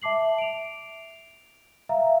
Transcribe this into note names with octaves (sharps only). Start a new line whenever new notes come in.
E5 A5 D6 C7 F#7
D7 F7
E5 F5 A#5